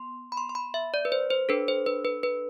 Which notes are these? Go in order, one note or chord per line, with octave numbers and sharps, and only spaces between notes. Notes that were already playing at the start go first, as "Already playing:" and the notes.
Already playing: B3 C6
B5
C6
C6
B5
E5
D5
B4
C5
C5
D4 A4 B4
C5
B4
B4
B4